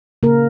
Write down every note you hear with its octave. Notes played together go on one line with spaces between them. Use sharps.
C#3 A#3 A#4